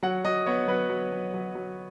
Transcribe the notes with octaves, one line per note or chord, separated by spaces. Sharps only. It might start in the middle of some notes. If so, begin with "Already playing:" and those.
F#3 F#5
F#3 D#5
B3 C#5
F#3 B4
F#3
F#3
F#3
F#3